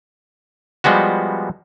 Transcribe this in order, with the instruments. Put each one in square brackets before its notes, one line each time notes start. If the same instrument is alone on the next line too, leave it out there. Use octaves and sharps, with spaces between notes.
[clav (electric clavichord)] F3 G3 G#3 B3 F#4